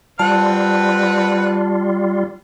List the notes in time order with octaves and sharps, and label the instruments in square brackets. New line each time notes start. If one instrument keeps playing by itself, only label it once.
[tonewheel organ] G3 F4 [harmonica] C4 B4 F#5 [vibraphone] A5